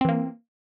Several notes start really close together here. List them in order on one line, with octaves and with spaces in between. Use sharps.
C4 E3 A#3